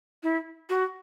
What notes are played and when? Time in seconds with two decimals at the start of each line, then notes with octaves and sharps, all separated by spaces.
0.23 E4
0.69 F#4